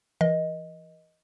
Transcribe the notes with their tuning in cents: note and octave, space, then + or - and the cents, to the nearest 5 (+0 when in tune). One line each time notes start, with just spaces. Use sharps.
E3 +35 A#4 +40 D#5 +5